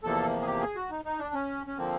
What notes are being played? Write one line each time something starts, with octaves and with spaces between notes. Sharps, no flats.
E2 C3 F3 A#3 A4
G#4
G4
G#4
F#4
D#4
D#4
D4
C#4
C#4
D3 F3 A#3 C4